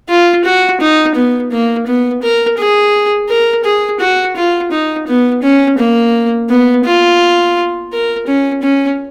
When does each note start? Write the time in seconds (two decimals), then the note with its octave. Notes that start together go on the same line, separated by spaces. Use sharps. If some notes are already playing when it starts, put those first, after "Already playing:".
0.09 F4
0.44 F#4
0.80 D#4
1.15 B3
1.51 A#3
1.86 B3
2.22 A#4
2.58 G#4
3.29 A#4
3.64 G#4
4.00 F#4
4.36 F4
4.71 D#4
5.07 B3
5.43 C#4
5.78 A#3
6.49 B3
6.85 F4
7.92 A#4
8.27 C#4
8.62 C#4